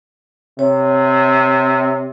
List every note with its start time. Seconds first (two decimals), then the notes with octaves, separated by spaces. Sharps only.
0.59 C3 C#5